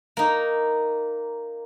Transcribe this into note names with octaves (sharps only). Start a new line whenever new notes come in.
A#3 D#4